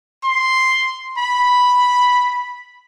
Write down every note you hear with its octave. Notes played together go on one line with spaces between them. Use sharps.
C6
B5